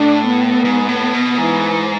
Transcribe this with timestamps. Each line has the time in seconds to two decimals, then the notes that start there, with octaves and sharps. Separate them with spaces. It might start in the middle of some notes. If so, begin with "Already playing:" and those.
Already playing: A2 D4
0.28 B3
0.65 G#2
0.88 A2
1.13 B2
1.37 G#2 E3